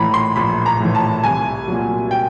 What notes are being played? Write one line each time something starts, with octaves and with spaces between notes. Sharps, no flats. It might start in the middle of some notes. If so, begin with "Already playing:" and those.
Already playing: A#1 A2 E3 A#5 B5
C6
A#1 B5
A#5
A2 E3
A5
C2 G#5
A#2 F#3
G5